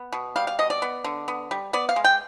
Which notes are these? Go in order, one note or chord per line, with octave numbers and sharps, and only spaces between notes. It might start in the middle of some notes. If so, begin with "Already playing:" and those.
Already playing: B3
B2
G3 F5
F5
B2 D#5
D5
B3
D3
B3
G3
B3 D5
F5
G#3
G5